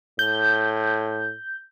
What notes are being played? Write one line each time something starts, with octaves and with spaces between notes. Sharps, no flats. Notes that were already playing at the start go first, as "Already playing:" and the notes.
A2 G6